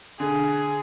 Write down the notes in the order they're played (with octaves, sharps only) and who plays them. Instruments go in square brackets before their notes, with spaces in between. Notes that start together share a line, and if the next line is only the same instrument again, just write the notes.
[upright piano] D3 [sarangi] G#4